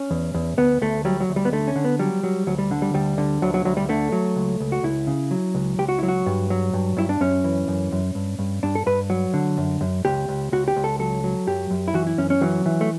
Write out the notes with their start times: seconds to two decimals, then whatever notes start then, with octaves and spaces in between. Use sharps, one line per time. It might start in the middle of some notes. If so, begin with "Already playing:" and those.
Already playing: C#4
0.11 E2
0.34 E2
0.57 D2 B3
0.82 D2 A3
1.05 F#3 G3
1.20 F#3
1.29 D2
1.36 G3
1.45 B3
1.52 D3 A3
1.68 C#4
1.76 D3
1.84 B3
1.99 F#3 G3
2.23 F#3
2.47 D2 F#3
2.59 G3
2.71 D3
2.82 G3
2.94 D2 G3
3.18 D3
3.42 D2 F#3
3.54 F#3
3.65 D2 F#3
3.77 G3
3.89 D3 A3
4.12 F#3
4.36 C#2
4.60 C#2
4.72 F#4
4.83 C#2 E4
5.07 C#3
5.31 F#3
5.55 C#2
5.79 C#2 G4
5.89 F#4
5.99 F#3 E4
6.08 F#4
6.26 G2
6.50 F#3
6.73 G2
6.97 G2 E4
7.09 D4
7.21 F#2 C#4
7.44 E3
7.68 F#2
7.92 F#2
8.15 G2
8.39 G2
8.63 G2 D4
8.75 A4
8.86 G2 B4
9.10 F#3
9.34 D3
9.58 F#2
9.81 F#2
10.05 C#2 G4
10.29 C#2
10.52 C#2 F#4
10.68 G4
10.76 C#2
10.84 A4
10.99 F#3 A4
11.24 F#3
11.47 F#2 G4
11.71 F#2
11.88 E4
11.94 E3 F#4
12.07 E4
12.18 F#2 C#4
12.30 C#4
12.41 E3 F#3
12.66 E3
12.81 A3